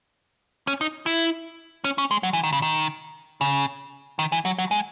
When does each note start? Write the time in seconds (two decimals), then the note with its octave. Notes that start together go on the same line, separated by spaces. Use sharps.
0.67 C#4
0.81 D#4
1.06 E4
1.84 C#4
1.98 C#4
2.11 G#3
2.23 F#3
2.33 E3
2.44 D#3
2.53 C#3
2.62 D#3
3.41 C#3
4.19 D#3
4.32 E3
4.45 F#3
4.58 F#3
4.71 G#3